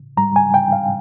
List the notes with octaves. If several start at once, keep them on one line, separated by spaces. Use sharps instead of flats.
G#2 G3 A#5
G#5
G5
F5